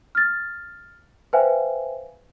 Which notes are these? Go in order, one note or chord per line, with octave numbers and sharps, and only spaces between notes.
F6 A6
B4 C5 E5 F5 G5 G#5